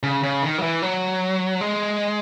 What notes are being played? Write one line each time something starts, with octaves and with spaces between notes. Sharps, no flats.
C#3
C#3
D#3
F#3
E3
F#3
G#3